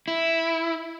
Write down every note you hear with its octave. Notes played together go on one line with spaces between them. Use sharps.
E4